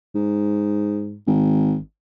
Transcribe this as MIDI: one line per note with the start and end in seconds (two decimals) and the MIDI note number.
0.15 1.17 44
1.27 1.76 32